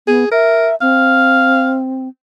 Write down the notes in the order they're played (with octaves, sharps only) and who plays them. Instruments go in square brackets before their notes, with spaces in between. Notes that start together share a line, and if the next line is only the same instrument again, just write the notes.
[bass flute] B3 [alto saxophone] G#4
[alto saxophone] A#4 [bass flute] E5
[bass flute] C4 [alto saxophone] F5